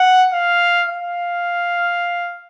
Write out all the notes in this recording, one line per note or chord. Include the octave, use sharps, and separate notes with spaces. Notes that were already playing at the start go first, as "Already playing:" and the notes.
Already playing: F#5
F5
F5